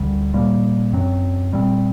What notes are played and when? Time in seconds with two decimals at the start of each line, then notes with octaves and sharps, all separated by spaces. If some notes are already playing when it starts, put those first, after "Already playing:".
Already playing: D2 D3 G3
0.34 A#2 G3 A#3
0.93 F#2 F#3 C4
1.52 A#2 G3 C4